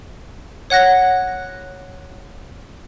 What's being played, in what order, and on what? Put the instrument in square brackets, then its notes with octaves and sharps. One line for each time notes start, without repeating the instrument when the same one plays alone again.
[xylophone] C#5 F#5 F#6 A#6